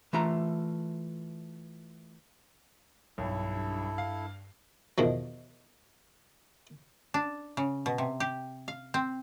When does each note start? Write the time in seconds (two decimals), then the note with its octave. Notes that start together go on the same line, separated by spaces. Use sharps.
0.13 E3 A3 F4 A#5
3.18 B1 G2 E4 A4
3.98 F5
4.98 E2 B2 D#3 F3
7.14 D4
7.57 C#3
7.86 B2
7.98 C3
8.20 G4
8.68 F5
8.94 C4